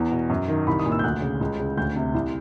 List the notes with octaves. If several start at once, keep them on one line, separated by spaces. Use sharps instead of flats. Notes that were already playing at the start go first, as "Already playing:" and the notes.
Already playing: E2 A#5
B2
F#2
D#3
C2 B5
D#6
A#2
E6
G6
D2 F#6
C#3
C#2
C#3
D2 G6
C3
C2